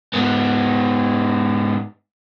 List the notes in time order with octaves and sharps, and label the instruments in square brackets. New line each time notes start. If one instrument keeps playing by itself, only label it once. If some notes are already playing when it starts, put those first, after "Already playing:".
[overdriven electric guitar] G#2 B3